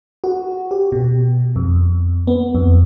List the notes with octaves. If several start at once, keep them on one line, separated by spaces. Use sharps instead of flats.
F#4
G4
B2
F2
B3
F2